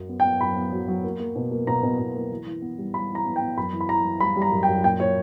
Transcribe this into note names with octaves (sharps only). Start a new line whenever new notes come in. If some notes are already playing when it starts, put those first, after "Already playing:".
Already playing: F#2 F#3
B3
G5
B3
F#2 B5
B3
F#3
F#3
A#3
A#3
B2
A#3
B2 A#5
B2
B2
A#3
E3
E3
B3
G3
G3 B5
E3
A#5
B3
G5
B3
F#2 B5
E3
B5
E3 A#5
E3
G3 B5
G3
A#5
F#2
G5
F#2
A#2 G5
A#2 C#5